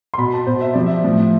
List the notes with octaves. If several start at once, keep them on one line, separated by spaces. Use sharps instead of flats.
C6
B2 B5
A5
B2 C5
E5
C3 F3 D5
E5
A2 F3